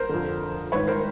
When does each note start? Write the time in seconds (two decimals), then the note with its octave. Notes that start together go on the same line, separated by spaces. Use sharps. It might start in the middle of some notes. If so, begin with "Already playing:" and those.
Already playing: A#4 C5
0.09 F2 D3
0.72 G#2 D#3 B4 C#5
0.87 A#4 C5